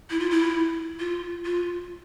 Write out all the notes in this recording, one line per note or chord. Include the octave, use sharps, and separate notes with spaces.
E4
F4
E4
F4
F4